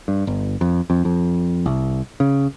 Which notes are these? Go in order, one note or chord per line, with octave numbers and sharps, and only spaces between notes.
G2
G1
F2
F2
F2
C2
C#3